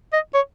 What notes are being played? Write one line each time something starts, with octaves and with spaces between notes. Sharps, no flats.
D#5
C#5